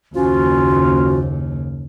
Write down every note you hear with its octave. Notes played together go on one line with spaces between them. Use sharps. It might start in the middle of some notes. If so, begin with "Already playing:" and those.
F#1 D#2 F3 C#4 F4 F#4